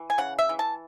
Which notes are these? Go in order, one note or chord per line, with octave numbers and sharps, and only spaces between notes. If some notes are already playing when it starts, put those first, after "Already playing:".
Already playing: E3
G#5
C#3 F#5
E5
E3
A5